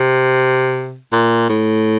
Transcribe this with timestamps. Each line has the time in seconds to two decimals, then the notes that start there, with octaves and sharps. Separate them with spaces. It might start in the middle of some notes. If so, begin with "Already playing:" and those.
Already playing: C3
1.12 A#2
1.49 A2